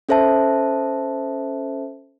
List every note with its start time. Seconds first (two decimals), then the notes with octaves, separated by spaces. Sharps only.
0.09 C#4 A4 C5 E5 A5